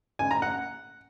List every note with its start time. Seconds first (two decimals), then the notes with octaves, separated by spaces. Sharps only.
0.19 G#5
0.31 A#5
0.42 F#5